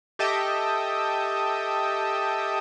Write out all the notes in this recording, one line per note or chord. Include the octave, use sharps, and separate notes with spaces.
G4 A4 D#5 E5 G5